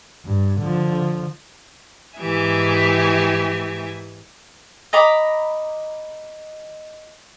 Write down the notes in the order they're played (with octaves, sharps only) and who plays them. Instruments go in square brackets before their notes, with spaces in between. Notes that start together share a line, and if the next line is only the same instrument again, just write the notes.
[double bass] G2
D3 F3
[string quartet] G#2 E3 G4 E5 G#5
[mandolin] D#5 A#5 B5 D6